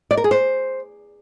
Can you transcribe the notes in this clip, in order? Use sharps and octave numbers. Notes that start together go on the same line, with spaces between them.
D5
A#4
G#4
C5